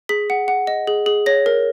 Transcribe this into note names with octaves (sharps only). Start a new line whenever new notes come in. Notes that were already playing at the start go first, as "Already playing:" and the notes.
G#4 B6
F#5
F#5
D#5
G#4
G#4
C#5 A#6
A#4